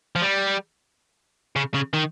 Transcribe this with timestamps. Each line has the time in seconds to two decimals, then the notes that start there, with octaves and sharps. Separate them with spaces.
0.16 F3
0.22 G3
1.56 C#3
1.74 C#3
1.93 D#3